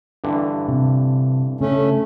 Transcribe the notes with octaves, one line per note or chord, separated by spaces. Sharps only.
G2 D3 E3
C3
C#3 A3 C#4